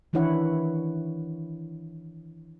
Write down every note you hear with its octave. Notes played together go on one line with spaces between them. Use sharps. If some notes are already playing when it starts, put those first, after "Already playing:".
D#3 E3 D4 E4 C#5 F#5